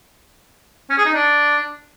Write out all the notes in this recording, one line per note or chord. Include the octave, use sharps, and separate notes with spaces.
C#4
G#4
D#4
D4